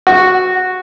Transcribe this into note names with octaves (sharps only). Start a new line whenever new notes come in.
F#4